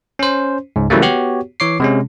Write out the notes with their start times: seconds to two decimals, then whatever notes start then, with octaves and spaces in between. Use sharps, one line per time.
0.19 C#4 C5
0.76 C#2 G#2
0.90 C#3 E3 F#3 G3 A3 A#3
1.02 B3 F#4 G4 C#5
1.60 E3 C#5 D6 C7
1.80 C3 G#3 C#4